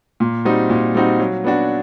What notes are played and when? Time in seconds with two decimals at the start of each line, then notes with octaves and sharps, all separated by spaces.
0.20 A#2
0.45 G3 C4 D#4 F#4
0.70 A#2
0.94 G3 C4 D#4 F#4
1.20 F#3
1.44 B3 D4 F#4